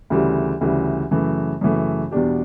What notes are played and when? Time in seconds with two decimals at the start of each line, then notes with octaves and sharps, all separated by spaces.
0.10 D2 C#3 E3 G3
0.61 D2 C#3 E3 G3
1.11 F#2 C#3 E3 A3
1.61 F#2 C#3 E3 A3
2.11 E2 B2 G3 D4 G4